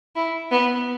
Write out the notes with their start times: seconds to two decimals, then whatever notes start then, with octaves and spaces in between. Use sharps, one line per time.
0.16 E4
0.51 B3